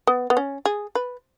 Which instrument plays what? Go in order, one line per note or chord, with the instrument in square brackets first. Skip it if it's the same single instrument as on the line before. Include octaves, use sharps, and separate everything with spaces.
[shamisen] B3
B3
C#4
G#4
B4